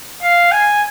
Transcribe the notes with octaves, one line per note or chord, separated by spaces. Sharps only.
F5
G#5